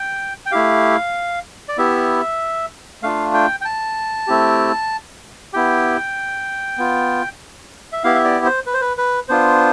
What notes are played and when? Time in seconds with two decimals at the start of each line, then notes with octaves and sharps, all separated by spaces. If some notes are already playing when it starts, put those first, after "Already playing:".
Already playing: G5
0.46 G5
0.52 A3 E4 G4 F5
1.68 D5
1.77 B3 E4 G4 E5
3.03 A3 D4 F4 F5
3.34 G5
3.61 G5
3.65 A5
4.27 A3 C4 E4 G4
5.53 B3 E4 G4 G5
6.78 B3 F4
7.92 E5
8.04 B3 E4 G4 F5
8.15 E5
8.24 D5
8.45 C5
8.66 B4
8.74 C5
8.81 B4
8.98 B4
9.29 B3 D4 F4 C5